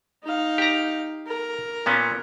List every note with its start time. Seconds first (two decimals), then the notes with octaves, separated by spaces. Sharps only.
0.24 D#4 F5
0.58 G4 A#5
1.27 A#4
1.86 A#2 B3 C#4